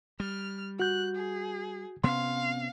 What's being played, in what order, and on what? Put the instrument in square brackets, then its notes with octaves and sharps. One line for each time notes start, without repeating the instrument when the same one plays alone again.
[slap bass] G3 [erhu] F6
[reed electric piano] F#4 G6 [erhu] F#6
[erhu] G#4
[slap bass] C3 B3 C#4 [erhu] F5 [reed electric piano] C6